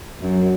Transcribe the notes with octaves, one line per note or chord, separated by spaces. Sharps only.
F#2